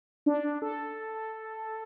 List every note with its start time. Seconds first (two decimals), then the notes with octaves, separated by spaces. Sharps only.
0.26 D4
0.62 A4